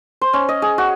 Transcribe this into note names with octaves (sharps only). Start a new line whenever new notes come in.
C5
C#4
D#5
G#4
F#4